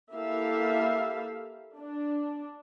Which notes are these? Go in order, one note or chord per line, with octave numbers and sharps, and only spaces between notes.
A#3 E4 G4 A4 E5 F5
D4